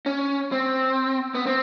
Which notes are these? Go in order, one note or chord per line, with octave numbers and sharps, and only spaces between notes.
C#4
C4
B3
C4